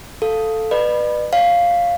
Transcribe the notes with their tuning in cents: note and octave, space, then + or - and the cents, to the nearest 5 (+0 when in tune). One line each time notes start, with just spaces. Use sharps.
A4 +0 F5 +0
B4 -10 D5 +45 B5 +0
C#5 +20 F5 +0